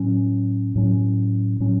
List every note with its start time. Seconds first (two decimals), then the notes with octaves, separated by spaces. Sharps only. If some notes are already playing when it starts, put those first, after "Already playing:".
Already playing: A2 F#3 C#4
0.76 A2 F#3 C#4
1.60 A2 F#3 C#4